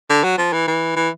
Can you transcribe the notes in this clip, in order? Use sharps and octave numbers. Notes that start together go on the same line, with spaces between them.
D3
F#3
F3
E3
E3
E3